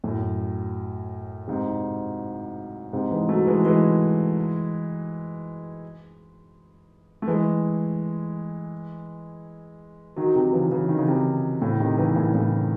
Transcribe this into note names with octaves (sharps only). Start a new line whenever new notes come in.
F#2 A2
G#2 C3
G#2 C3
E3 G#3
F#3 A3
E3 G#3
E3 G#3
A3
E3 G#3
D#3 F#3
C3 D#3
C#3 E3
C#3 E3
D#3
C#3
C3 D#3
A2 C#3
C3 D#3
C#3 E3
A2 C#3
A2 C#3